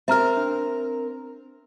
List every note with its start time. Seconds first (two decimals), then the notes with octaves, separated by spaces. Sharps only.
0.08 C4 A#4 E5 A#5 F6
0.37 D4